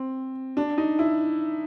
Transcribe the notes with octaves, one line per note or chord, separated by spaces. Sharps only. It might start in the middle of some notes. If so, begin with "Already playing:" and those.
Already playing: C4
D4
D#4
E4